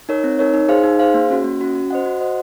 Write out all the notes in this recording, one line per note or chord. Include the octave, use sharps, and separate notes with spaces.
D#4 A#4 C#5
C4
D#4 A#4 C#5
D#4
G#4 C5 F5
D#4
G#4 C5 F5
A#3
C#4 F#4
A#3
C#4 F#4
F#4
C5 D#5 F#5
F#4
C5 D#5 F#5